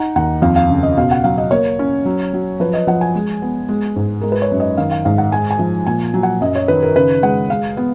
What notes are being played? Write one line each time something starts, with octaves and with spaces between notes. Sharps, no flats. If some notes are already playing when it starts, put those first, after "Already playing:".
Already playing: D#4 F#5
D#2 F#5
F2 F5
F5
C#3
D#5
B2 F5
F#5
F#3 F5
D#5
A#3 C#5
C#4
F#3
F#3
F3 B4
D#5
F3 F#5
G#5
G#3
B3
G#3
G#2
G#3 A#4
B4
C#5
F#2
D#5
D#3 F5
F5
G#2 F5
F#5
G#3 G#5
G#5
F3
A#2 G#5
F#3
F#5
F#2 D#5
C#5
D#3 B4
A#4
C#3 B4
G#3 F#5
G#3 F5
B3